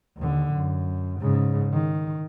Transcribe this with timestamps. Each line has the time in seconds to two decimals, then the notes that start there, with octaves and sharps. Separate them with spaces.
0.17 D#2 D3
0.54 F#2
1.20 G#2 C#3
1.73 D#3